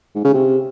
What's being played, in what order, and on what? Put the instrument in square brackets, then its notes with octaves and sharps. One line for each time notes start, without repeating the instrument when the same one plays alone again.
[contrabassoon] G#2
C#3
C3